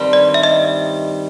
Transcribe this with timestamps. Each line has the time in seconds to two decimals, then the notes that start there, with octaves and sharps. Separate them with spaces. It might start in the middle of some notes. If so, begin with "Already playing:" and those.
Already playing: G2 D#3 G3 C4
0.13 D5
0.34 E5
0.43 D#5